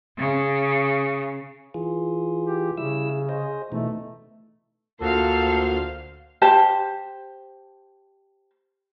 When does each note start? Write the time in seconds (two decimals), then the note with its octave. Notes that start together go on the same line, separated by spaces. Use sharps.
0.18 C#3
1.74 E3 F4 G#4
2.45 G4
2.77 C#3 G3 E4 E6
3.29 G#4 C5 D#5
3.72 B2 E3 A3 D#4
5.01 D2 A#2 F#4 A4 C5 F5
6.42 G4 C5 A5